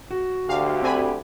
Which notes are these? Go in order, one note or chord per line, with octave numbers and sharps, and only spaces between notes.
F#4
D2 D3 G4 F5
C4 G#5 B5